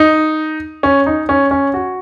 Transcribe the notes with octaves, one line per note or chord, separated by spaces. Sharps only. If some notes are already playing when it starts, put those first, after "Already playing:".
Already playing: D#4
C#4
D#4
C#4
C#4
F#4